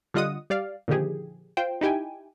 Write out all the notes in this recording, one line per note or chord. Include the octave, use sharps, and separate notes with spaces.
D3 G3 F4 D#5 F#5 D#6
G3 D5 F5
A#2 D3 D#3 F3 G4 G#4
F4 C5 G5
D#4 E4 G4 G5 G#5